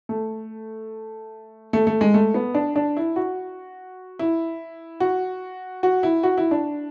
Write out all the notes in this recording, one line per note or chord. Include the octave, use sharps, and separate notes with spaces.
A3
A3
A3
G#3
A3
B3
D4
D4
E4
F#4
E4
F#4
F#4
E4
F#4
E4
D4